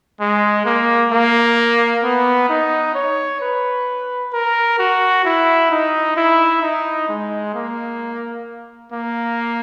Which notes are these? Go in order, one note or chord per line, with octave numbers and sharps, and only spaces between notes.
G#3
A#3
A#3
B3
D#4
C#5
B4
A#4
F#4
E4
D#4
E4
D#4
G#3
A#3
A#3